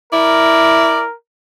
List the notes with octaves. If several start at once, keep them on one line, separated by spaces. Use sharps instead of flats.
E4 A#4 D5